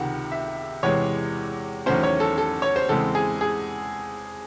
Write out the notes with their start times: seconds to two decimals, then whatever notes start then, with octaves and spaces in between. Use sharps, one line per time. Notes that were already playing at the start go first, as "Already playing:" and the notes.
Already playing: C#2 C3 D#3 F#5
0.32 E5
0.83 E2 C3 E3 G#3 C#5
1.86 E2 D#3 F#3 A3 C#4 C5
2.03 C#5
2.20 A4
2.38 A4
2.62 C#5
2.76 C5
2.89 E2 C#3 G#3 C4 A4
3.15 G#4
3.41 G#4